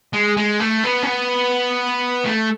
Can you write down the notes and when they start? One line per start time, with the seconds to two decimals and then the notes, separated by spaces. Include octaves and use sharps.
0.13 G#3
0.37 G#3
0.60 A3
0.84 B3
1.03 C#4
1.07 B3
2.25 A3